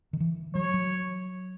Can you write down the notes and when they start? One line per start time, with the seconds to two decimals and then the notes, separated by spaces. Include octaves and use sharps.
0.13 D#3
0.20 E3
0.55 F#3 C#5
0.74 F#3